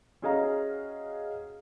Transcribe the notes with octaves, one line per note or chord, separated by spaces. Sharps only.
C#4 F#4 G#4 D#5 F5 A#5